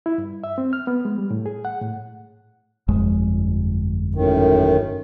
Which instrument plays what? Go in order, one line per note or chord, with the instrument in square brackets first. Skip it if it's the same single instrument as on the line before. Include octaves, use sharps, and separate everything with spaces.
[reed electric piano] E4
G2
E5
C4
F6
B3
G#3
G3
A2
G#4
F#5
A2
[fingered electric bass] G1 F2 G#3
[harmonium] F#2 A2 D#3